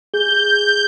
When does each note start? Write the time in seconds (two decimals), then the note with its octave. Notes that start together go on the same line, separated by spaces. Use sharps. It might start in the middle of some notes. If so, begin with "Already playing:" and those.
0.14 G#4 G6